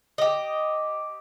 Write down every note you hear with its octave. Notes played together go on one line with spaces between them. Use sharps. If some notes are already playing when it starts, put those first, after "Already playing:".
G4 D#5